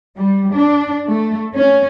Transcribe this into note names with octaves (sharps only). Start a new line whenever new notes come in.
G3
D4
A3
C#4